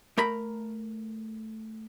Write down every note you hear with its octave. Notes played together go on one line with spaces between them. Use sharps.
A3 A#4 A#5 B5